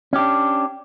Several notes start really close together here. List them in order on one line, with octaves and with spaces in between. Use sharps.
C#4 G4 D4